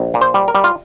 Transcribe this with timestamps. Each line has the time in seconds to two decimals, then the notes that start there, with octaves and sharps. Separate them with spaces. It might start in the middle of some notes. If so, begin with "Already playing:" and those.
Already playing: A#1
0.14 A#2
0.21 C5
0.34 G3
0.48 A#4
0.55 G3
0.64 F4